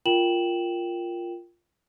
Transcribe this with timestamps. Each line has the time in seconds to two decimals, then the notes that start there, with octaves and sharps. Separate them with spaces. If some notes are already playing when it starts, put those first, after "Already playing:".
0.06 F4 A#4 G5 E7 F#7